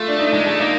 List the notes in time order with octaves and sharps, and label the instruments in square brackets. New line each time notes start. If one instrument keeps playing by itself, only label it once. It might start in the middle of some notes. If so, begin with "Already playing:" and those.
Already playing: [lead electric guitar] A3 [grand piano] F4
[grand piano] D4
D#4
[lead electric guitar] G#3
A3
[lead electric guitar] A#3 [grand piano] D#4